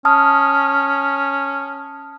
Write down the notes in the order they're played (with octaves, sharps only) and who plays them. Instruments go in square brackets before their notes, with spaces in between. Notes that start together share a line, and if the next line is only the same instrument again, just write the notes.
[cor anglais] C#4 [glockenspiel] A5 D#6 F6